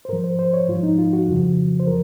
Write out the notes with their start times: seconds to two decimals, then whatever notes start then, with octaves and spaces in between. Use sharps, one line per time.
0.05 C5
0.09 G#2 A#4
0.13 F3
0.24 C5
0.39 C5
0.53 C#5
0.68 G#2 F4
0.73 F3
0.83 D#4
0.98 F4
1.13 F#4
1.28 F2 C#3 F3
1.80 C5
1.87 F3 A#4